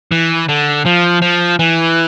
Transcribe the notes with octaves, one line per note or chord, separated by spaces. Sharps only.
E3
D3
F3
F3
E3